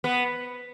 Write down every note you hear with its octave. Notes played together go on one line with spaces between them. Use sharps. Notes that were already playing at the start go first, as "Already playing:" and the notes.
B3